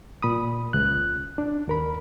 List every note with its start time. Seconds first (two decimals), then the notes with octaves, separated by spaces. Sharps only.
0.22 A#2 B5 D#6
0.73 C#2 F#6
1.38 D4
1.68 D#2 A#4 B5